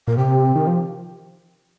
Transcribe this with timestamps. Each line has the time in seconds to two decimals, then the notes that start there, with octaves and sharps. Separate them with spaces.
0.08 A#2 A#4
0.17 C3 G4
0.56 D#3
0.67 F3